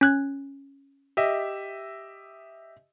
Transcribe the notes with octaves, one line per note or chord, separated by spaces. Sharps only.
C#4 F#6 G#6
G4 D#5 E5